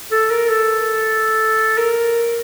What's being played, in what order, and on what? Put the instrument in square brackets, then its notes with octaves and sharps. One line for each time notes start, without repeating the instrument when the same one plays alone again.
[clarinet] A4
A#4
A4
A#4